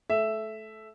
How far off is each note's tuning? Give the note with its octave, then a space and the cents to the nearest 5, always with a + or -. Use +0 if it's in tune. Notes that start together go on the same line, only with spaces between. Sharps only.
A3 -25 E5 +5